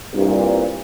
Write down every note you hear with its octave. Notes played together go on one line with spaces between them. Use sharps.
C2 G2 A#2